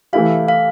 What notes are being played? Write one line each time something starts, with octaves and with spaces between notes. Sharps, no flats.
E3 A3 E4 G4 F5
F5